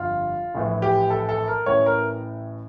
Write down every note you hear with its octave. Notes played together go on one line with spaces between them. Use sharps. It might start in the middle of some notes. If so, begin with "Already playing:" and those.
Already playing: G1 F2 D3 F4
A#1 A2 E3
G4
A4
A4
A#4
A1 A2 E3 C#5
A#4